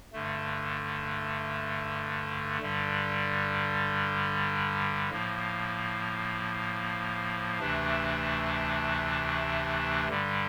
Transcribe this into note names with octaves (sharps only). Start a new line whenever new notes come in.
G2 D3 A3
G2 D3 G3
A2 F3 A#3
D2 C3 E3 A3 D4
G2 D3 G3